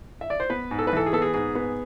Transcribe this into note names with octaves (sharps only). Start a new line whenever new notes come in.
E5
D5
C5
B3 B4
G#2
A4
B4
E3 A4
G#4
B3 A4
G#4
G#2 G#4
B3